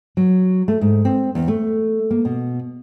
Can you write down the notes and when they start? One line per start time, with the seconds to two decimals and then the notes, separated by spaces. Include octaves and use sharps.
0.17 F#3
0.68 A3
0.81 G#2
1.05 C4
1.35 E2
1.48 A3
2.11 A#3
2.25 B2